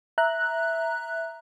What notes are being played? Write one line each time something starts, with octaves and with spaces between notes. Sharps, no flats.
E5 A#5 F#6